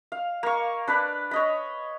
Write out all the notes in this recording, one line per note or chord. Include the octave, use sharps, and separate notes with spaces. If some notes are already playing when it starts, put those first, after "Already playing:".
F5
A#3 C#6
D4 B4 D5 B5
C#5 D#5 B5